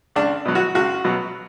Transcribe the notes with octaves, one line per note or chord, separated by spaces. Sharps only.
C#2 D4
B2 F#3
F#4
C#2 F#4
B2 F#3